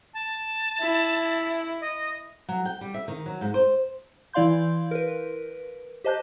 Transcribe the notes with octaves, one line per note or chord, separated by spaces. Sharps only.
A5
E4
D#5
F#3
G5
G3
E5
D#3
F#3
G#2
C5
E3 E4 D5 F5 C6 G6
A#4 B4
G4 C5 D#5 A5 F#6 G6